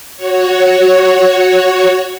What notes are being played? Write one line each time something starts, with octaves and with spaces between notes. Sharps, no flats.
F#4 C#5